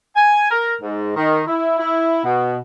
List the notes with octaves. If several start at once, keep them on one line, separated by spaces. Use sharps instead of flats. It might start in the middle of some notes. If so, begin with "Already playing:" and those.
G#5
A#4
G#2
D#3
E4
E4
B2